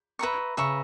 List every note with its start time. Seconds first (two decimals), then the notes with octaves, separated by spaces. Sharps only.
0.19 B4 E5 A#5 C#6
0.57 C#3 B4 E5 A#5 C#6